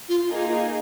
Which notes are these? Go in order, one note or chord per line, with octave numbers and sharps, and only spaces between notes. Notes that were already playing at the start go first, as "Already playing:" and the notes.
F4
A#3 D#4 G#4